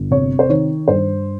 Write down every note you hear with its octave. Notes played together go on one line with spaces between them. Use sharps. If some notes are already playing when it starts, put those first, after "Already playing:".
Already playing: G1
C3 C#5
C5
D#3 C#5
G2 C5